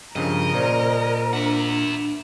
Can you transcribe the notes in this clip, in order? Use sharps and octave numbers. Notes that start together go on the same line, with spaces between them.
G2 C#3 F3 A#4 D#5
A#2 C5 D5
D4 E4 F#5